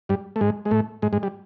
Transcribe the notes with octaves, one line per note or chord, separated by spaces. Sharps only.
G2 G3
A3
G#2 G#3
G#3
A2 A3
G#2 G#3
G#2 G#3
G3